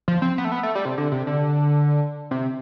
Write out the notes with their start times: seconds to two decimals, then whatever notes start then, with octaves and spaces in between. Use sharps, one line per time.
0.08 F3
0.22 C4
0.38 B3
0.45 A3
0.52 B3
0.63 A3
0.75 G3
0.85 C3
0.98 D3
1.12 C3
1.27 D3
2.31 C3